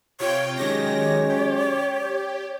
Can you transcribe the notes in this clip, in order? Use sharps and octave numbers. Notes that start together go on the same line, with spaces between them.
C3 F4 C#5 G5
D#3 F#3 G#3 C#4 G4 C#5 A#6
G4